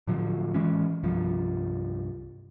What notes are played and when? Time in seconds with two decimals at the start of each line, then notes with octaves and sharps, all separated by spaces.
0.08 A2 D3 F3 F#3
0.54 E3 G#3 C#4
1.03 C2 G2 F3